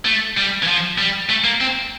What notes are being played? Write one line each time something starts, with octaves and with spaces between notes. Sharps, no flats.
A3
G3
E3
F3
G3
A3
A#3
C4